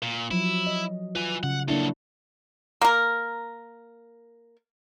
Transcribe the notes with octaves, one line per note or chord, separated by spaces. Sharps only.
A#2
F3 F#3 E4
D#5
F4 B4 G#5
C#3 F#5
F#3 A#3 D4 E4 A4
A#3 A#4